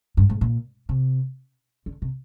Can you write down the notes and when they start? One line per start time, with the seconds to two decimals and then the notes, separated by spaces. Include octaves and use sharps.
0.17 G2
0.29 G#2
0.41 A#2
0.89 C3
1.86 D3
2.02 C3